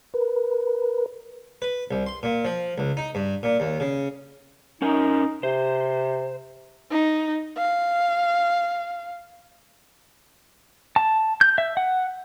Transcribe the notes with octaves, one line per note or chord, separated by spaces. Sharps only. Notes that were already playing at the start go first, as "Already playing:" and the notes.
A#4 B4
B4
C2
C6
A#2
F3
C#2
D#4
G2
A#2
D#2
C#3
C#4 D#4 A#4 G#5
C3 C5
D#4
F5
A5
G6
E5
F#5